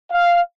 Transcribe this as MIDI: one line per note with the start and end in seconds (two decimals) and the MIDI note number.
0.12 0.39 77